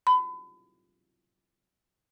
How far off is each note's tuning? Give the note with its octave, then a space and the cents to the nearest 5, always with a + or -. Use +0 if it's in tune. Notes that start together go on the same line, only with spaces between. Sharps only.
B5 +35